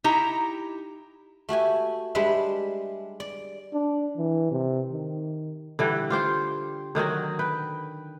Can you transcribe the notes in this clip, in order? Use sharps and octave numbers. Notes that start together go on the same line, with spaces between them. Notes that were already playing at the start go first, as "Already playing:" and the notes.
D#4 E4 G4 A#5
A3 F#4 G4 G#5
G3 G#3 D4 B4 E5
D5
D4
E3
C3
D#3
D3 E3 G3
F4 G4 C5 G5
D3 D#3 F#3 F#4
B4 G5